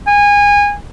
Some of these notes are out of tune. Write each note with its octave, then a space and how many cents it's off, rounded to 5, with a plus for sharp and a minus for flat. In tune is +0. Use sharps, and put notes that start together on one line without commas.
G#5 -25